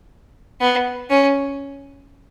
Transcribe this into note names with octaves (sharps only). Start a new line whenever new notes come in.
B3
C#4